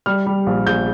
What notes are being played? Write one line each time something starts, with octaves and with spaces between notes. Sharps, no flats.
G3 F6
G3
A#1
A#1 G6